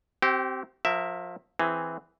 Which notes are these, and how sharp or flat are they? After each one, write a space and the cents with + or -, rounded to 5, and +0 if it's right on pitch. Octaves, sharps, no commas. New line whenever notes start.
C4 +0 G4 -35
F3 +30 A#4 +0 E5 +0
E3 +0 C4 +0 G#4 +0